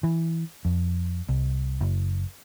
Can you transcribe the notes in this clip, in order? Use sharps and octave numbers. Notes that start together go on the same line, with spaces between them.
E3
F2
C2
F#1